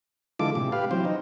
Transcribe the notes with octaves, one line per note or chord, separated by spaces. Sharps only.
D3 E3 G#3 F4 A4 D6
A2 C3
G4 B4 F5
E3 F#3 C4 C5
D#4